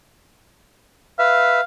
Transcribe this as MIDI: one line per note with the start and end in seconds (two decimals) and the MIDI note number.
1.19 1.61 71
1.19 1.61 76
1.19 1.63 77